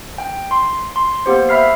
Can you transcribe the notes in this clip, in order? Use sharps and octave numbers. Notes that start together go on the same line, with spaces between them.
G5
C6
C6
A#3 B3 G4 C5
E5 B5 F6 C7